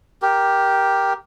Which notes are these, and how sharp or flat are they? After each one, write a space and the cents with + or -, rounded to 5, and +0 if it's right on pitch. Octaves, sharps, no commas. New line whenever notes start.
G4 +0 A#4 +10